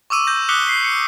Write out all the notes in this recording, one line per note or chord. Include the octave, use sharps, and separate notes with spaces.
C#6 D6 E6 D#7
G6 A#6
D6 D#6 F#6 B6 C#7 G7
B6 C7
C#7